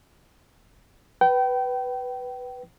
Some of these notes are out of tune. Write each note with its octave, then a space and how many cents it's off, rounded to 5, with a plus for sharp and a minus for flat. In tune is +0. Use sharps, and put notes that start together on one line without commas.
B4 +0 G5 -30